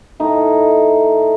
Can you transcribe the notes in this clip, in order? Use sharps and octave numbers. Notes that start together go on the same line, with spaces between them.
A2 A3 D#4